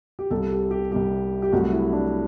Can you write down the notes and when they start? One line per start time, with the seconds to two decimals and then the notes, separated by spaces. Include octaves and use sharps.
0.19 G4
0.31 C2 C3 G3 A4
0.51 G4
0.71 G4
0.91 C2 C3 G3 G4
1.42 G4
1.52 C2 C3 F#3 A3 F#4
1.73 E4
1.93 D4